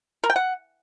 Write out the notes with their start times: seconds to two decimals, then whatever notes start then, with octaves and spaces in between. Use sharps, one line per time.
0.24 A#4
0.30 G5
0.36 F#5